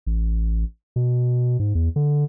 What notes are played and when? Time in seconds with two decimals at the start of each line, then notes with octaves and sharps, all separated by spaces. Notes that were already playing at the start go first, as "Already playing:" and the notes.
0.07 A1
0.96 B2
1.60 G#2
1.75 E2
1.96 D3